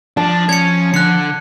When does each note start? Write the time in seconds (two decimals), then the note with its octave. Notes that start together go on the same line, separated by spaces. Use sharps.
0.17 F3 D4 A5
0.49 C#4 G#6 C#7
0.94 D3 F#6 C#7